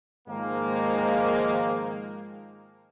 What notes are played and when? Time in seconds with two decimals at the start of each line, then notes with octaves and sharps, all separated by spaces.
0.28 G#2 D#3 F3 G#3 A#3